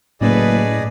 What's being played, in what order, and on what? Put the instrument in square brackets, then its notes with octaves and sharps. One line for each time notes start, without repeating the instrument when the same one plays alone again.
[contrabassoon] F#1 [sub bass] A2 [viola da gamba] A3 B4 [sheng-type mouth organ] G#4 D5 D#5